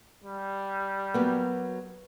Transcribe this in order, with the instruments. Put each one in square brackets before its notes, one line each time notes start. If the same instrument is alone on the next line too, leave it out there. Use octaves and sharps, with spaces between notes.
[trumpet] G3
[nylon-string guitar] F#3 A#3 B3